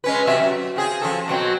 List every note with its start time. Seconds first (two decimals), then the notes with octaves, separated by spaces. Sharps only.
0.04 G#3 C#4 B4
0.27 C3 F#3 E5
0.39 F#3
0.76 C#3 C4 G#4
1.02 F3 C#4 A4
1.28 B2 F#3 C4